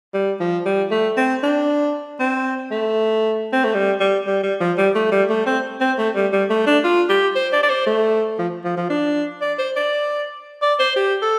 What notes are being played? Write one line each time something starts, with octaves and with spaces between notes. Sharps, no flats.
G3
F3
G3
A3
C4
D4
C4
A3
C4
A3
G3
G3
G3
G3
F3
G3
A3
G3
A3
C4
C4
A3
G3
G3
A3
D4
F4
G4
C5
D5
D5
C5
A3
F3
F3
F3
D4
D5
C5
D5
D5
C5
G4
A4